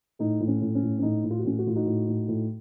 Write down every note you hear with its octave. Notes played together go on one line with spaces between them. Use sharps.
A2 D#4
A2
C#4
A2
C#4
A2
C#4
A2 D#4
A2
F4
F#4
A2 C#4 F4
F#4
A2 F4
D#4 F#4
A2
A2
A2